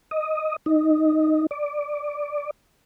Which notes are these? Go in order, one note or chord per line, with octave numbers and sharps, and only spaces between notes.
D#5
D#4
D5